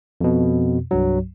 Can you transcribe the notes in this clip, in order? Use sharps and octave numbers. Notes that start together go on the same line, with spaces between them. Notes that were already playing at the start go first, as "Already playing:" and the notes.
F2 B2
C2 G2 F#3